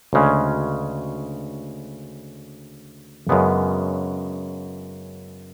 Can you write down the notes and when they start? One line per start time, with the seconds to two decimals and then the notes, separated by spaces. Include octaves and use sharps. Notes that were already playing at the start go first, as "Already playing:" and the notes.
0.13 D2 C#3 G#3 C#4
3.29 F#2 C#3 G#3 B3 D4